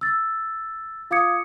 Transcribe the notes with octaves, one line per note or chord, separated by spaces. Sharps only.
E6 A6
F4 F5 D6 D#6 G#6 C#7